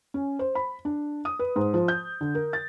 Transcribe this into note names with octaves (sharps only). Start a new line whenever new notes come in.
C#4
C5
B5
D4
D#6
B4
G#2
F3
G6
D3
A#4
A6